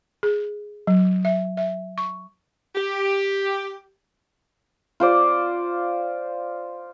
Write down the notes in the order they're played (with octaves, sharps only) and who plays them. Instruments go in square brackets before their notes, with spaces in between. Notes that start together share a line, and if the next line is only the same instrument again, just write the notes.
[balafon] G#4
F#3
E5
E5
C#6
[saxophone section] G4
[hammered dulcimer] F4 C5 D5